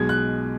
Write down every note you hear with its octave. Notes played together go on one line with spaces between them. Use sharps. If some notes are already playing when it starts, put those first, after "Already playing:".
Already playing: B1 B2 G#3 G#6
F#6